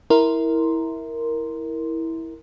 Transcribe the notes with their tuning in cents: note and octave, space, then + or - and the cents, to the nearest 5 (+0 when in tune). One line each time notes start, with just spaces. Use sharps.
E4 -15 A#4 +0 C6 +0